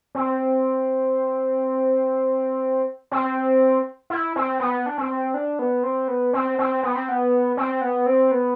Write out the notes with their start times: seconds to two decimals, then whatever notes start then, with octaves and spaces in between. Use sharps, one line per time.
0.15 C4
3.12 C4
4.10 E4
4.36 C4
4.60 B3
4.86 D4
4.98 C4
5.34 D4
5.59 B3
5.83 C4
6.08 B3
6.33 C4
6.59 C4
6.83 B3
6.96 C4
7.09 B3
7.57 C4
7.81 B3
8.06 C4
8.31 B3